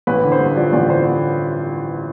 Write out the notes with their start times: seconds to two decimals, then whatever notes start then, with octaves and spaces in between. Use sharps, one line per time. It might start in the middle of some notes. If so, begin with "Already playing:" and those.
0.07 A1 B4
0.24 D3
0.32 C5
0.40 G2
0.56 F3 D5
0.73 A1 D5
0.89 D3 C5